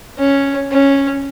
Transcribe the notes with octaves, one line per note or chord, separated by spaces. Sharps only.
C#4
C#4